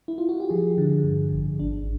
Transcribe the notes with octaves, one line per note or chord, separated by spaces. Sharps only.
E4
F4
F#4
G4
F3 G#4
D3
G2
A1
G#1 D4